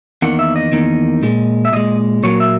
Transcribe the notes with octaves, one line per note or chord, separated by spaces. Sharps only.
E2 D#3 A#3 F#5
E5
D#5
E2 D#3 A#3
A#2 G#3
E5
A#2 G#3 D#5
A#2 F#3 A#3 C#5
E5